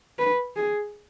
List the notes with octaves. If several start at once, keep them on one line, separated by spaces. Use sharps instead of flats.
B4
G#4